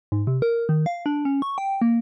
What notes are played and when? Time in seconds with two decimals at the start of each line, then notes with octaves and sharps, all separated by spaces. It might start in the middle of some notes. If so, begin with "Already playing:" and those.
0.12 G#2
0.27 C3
0.42 A#4
0.69 D#3
0.86 F5
1.06 D4
1.25 C#4
1.42 C#6
1.58 G5
1.82 A#3